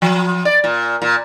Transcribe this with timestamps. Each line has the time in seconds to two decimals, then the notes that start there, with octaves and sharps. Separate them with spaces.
0.02 F3
0.45 D5
0.64 A#2
1.02 A#2